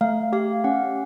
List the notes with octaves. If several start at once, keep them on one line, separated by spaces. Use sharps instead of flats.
A3 F5
G4 F5
C#4 F#5